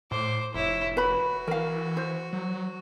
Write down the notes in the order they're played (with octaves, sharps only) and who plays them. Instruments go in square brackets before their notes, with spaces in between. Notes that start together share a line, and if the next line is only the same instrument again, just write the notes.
[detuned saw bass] A2 [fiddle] C5 D6
[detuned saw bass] F1 [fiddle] E4 C#5
[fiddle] F#4 [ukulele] B4 B5
[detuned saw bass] E3 [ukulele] A#4 F5
[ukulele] C5
[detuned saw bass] F#3